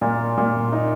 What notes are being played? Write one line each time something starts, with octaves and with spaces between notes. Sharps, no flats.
A#2
A#2
D#4